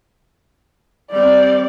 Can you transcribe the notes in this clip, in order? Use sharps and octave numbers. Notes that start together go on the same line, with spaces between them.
G3 C4 D5